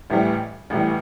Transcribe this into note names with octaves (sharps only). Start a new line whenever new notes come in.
A1 A2 E3 G3
A1 A2 E3 G3